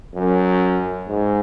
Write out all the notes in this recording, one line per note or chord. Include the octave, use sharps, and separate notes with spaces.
F#2
G#2